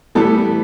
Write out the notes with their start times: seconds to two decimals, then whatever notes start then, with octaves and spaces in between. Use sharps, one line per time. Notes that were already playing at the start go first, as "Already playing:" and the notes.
0.15 A2 E3 G3 B3 A4